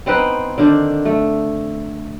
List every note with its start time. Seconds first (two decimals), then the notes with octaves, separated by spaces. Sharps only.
0.06 B3 C4 D#4 B4
0.58 D3 D#3 D4 C5
1.05 A3